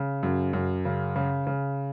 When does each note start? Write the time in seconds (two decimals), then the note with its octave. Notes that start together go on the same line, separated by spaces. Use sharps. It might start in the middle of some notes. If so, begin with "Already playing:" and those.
Already playing: C#3
0.23 F#2
0.53 F#2
0.85 C#3
1.16 C#3
1.47 C#3